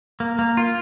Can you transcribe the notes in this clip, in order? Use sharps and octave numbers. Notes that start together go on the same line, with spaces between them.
A#3
A#3
F4